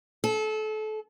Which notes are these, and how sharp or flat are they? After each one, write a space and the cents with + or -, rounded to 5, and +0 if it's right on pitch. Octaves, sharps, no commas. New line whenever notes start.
A4 -30